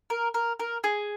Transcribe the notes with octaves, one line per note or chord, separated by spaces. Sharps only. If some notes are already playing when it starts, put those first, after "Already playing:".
A#4
A#4
A#4
G#4